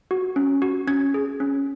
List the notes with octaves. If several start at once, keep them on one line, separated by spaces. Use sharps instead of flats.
F#4
C#4
F#4
C#4 G#6
G#4
C#4